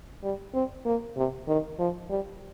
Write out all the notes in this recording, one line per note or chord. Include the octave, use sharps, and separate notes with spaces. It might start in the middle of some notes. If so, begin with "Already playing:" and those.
G3
C4
A#3
C3
D#3
F3
G3